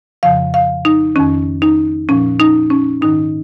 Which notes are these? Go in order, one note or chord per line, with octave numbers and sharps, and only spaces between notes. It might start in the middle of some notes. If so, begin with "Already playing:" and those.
F2 C#3 F3 F5
F5
D#4
F2 D#3 C#4
D#4
A#2 F3 C#4
D#4
C#4
G#2 D#3 D#4